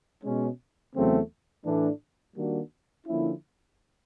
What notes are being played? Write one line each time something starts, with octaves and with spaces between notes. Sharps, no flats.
B2 G#3 C#4
E2 C#3 F#3 A3 C4
A2 E3 A3 D4
D#3 G3 A#3 D4 F#4
D3 F3 A#3 C#4 E4